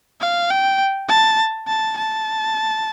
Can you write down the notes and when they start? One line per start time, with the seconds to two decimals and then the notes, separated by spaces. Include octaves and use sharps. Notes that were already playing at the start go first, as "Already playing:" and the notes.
0.21 F5
0.50 G5
1.08 A5
1.68 A5
1.97 A5